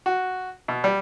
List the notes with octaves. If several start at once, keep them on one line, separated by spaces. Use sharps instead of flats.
F#4
B2
G3